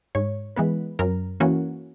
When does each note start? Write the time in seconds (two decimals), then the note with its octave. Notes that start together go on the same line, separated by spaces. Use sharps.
0.15 G#2 C#5
0.56 E3 G#3 B3 B4
0.99 F#2 A#4
1.40 E3 A#3 C#4 F#4